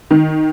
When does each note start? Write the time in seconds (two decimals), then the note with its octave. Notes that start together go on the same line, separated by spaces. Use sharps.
0.11 D#3